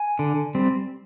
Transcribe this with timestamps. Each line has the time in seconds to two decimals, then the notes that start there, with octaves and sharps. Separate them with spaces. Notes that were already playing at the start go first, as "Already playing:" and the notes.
Already playing: G#5
0.19 D3
0.55 G3 C4